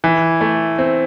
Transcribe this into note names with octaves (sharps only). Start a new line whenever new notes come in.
E3
A3
C4